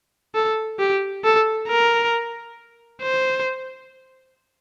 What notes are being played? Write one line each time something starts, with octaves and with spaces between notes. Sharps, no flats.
A4
G4
A4
A#4
C5